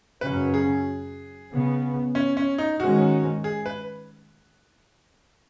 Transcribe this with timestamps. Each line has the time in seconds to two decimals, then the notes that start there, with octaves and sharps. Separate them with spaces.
0.21 F#2 C#3 F#3 C#4 B4
0.54 G#4
1.50 C#3 B3
2.15 C#4
2.37 C#4
2.58 D#4
2.79 G#2 D#3 G#3 C#4 F#4
3.44 G#4
3.66 B4